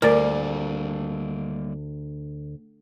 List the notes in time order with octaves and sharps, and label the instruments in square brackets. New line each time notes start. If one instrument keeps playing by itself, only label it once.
[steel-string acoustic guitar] D2 [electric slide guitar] G3 A#3 [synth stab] A#4 D5